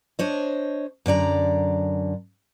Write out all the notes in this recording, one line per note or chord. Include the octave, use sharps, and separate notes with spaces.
D4 C5 C#5 D#5
F#2 D3 D5 A#5